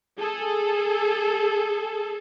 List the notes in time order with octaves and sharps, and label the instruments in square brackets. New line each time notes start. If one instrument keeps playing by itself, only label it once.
[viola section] G#4 A4